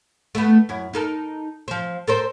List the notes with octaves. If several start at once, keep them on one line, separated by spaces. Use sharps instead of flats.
A3 B3
F#2 E4
D#4 A4 A#4
F3 C4
A4 A#4 C5